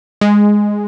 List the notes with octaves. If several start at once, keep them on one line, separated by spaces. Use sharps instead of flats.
G#3